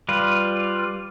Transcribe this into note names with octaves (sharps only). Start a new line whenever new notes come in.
G3 F4 B4